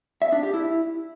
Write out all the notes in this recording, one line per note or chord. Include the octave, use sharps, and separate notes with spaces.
E5
D4
G4
E4